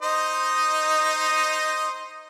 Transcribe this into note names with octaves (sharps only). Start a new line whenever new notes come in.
D#4 C5 D#5